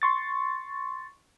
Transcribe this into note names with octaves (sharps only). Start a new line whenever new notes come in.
C6 C#6 A6